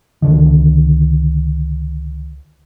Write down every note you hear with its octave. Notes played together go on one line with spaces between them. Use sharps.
C#2 D3 D#3